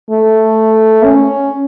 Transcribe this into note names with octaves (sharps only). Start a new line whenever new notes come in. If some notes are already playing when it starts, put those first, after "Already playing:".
A3
C#4